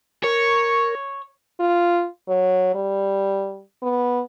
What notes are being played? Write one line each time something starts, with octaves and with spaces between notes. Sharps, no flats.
A#4 C#5 C#6
F4
F#3
G3
B3